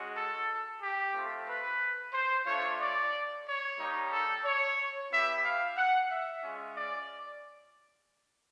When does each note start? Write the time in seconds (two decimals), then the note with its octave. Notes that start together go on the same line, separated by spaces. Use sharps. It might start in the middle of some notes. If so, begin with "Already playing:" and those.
Already playing: G#3 C#4 F#4
0.15 A4
0.80 G4
1.14 A3 C4 F4
1.48 B4
2.13 C5
2.46 A3 D4 F4 C#5
2.80 D5
3.45 C#5
3.79 G3 A#3 D#4 G4
4.11 A4
4.44 C#5
5.11 B3 E4 G4 E5
5.43 F5
5.77 F#5
6.10 E5
6.43 G#3 C#4 F4
6.76 D5